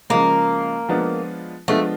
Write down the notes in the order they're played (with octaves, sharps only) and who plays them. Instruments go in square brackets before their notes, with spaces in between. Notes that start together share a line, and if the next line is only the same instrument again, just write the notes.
[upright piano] C#3 F3 G#3 [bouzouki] A#3
[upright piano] F3 G#3 B3 D4 F4
[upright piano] F3 G#3 B3 D4 F4 [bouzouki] A3